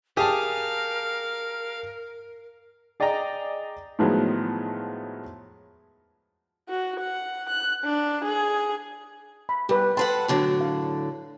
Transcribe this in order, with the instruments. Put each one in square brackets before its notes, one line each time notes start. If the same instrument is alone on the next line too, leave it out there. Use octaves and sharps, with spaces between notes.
[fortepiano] G4 A5 [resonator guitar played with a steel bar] G#4 [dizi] A#4 [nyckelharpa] F5
[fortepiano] G#4 D5 D#5 G5 A#5
A2 D#3 F3 F#3 G#3 B3
[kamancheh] F#4
F#5
F#6
D4
G#4
[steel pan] B5
[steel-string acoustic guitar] G3 [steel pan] G4 B4
[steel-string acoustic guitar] A4 B4 F#5 [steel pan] G5 C6
[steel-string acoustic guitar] A2 D3 F#3
[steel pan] F5